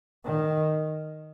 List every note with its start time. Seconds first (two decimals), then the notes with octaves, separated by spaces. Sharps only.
0.25 D#3